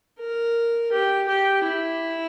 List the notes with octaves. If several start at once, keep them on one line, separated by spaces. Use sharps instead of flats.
A#4
G4
G4
E4